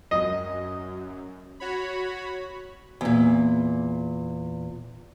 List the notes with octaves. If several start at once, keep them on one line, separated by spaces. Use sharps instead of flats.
F#2 D#5
F#4 C#5 B5
E2 A#2